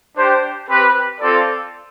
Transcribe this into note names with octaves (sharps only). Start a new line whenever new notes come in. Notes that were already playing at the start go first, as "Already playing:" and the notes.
D4 G4 C5 G5
C4 G4 B4
C4 F4 A4 D5